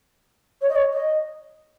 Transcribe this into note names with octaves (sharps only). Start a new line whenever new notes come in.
C#5
D#5
C#5
D#5